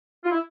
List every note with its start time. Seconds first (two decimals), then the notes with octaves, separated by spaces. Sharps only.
0.24 F4
0.31 E4